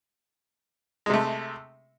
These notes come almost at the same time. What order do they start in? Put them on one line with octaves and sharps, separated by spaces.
G#3 C3 A3